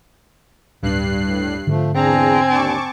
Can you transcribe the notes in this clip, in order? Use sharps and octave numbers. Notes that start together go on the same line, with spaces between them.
D1 G2 D4 F#6 C7
A2
G#2 D3 F3 A3
E2 C4 D4 G#4 G#5 A#5
D#2 D4 A5 C#6 D6